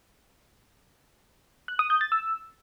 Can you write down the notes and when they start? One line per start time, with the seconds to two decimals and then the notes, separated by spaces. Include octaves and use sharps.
1.68 F#6
1.79 D#6
1.90 G6
2.01 A6
2.12 E6